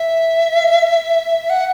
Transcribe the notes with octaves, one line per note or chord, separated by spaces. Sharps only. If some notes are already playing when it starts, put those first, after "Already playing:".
Already playing: E5
F#5